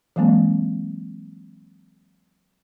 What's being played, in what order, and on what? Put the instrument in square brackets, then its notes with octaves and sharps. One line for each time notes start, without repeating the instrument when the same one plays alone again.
[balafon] E3 F#3 G#3 A#3 C4